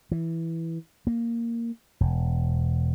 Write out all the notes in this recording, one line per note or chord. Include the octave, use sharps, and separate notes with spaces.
E3
A#3
E1